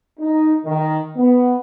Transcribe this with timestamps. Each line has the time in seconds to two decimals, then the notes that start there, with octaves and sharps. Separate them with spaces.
0.20 D#4
0.65 D#3
1.17 B3